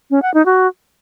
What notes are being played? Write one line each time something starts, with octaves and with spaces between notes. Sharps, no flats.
C#4
F#5
D#4
F#4